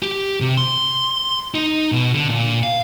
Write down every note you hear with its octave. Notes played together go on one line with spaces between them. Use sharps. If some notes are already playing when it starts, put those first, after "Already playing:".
G4
C3
C6
D#4
B2
D3
A#2
F5